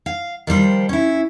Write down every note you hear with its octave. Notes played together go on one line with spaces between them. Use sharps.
F5
D#3 F3 G3 C5
C#4 E4